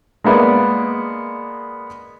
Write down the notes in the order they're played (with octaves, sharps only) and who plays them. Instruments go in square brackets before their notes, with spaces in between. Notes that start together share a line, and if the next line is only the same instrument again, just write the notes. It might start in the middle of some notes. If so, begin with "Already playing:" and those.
[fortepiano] G#3 A#3 B3 D5